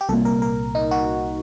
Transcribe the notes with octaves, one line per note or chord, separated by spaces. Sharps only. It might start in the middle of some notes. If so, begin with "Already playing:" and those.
G4
C2 A#2 A4
A#4
A#4
D#4
F#4